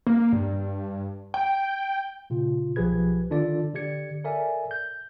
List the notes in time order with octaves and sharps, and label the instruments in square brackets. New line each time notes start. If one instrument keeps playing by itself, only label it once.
[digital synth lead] A#3
G2
G5
[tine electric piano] A#2 C#3 F4
B1 F3 G4 G#4 B4 G#6
D3 D#3 D4 F4 A4 D5
D3 G4 D5 G#6 C#7
A4 A#4 C#5 D5 E5 G#5
G6